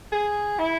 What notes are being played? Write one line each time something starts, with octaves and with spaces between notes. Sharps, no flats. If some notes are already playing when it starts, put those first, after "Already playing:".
G#4
E4